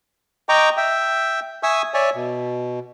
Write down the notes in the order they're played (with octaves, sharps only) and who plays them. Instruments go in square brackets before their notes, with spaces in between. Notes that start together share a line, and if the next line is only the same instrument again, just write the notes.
[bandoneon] D#5 G5 A#5 C#6 D6
E5 G5
E5 G#5 C#6 D#6 E6
C#5 D5 E5 G#5
B2